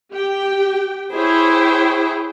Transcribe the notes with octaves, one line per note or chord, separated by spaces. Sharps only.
G4 G5
E4 G#4 C5 C#5 G5